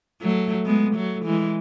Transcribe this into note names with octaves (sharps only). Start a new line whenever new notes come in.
F#3 A3
G#3 B3
F#3 A3
E3 G#3